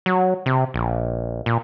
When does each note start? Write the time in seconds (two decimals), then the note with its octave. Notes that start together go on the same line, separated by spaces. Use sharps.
0.06 F#3
0.46 C3
0.74 A#1
1.46 A#2